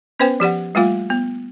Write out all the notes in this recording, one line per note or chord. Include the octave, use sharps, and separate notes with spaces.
B3 C#4 B4 C5 G5 G#5
F3 G4 D5 F#5
G3 A3 A#3 F4 F5
B3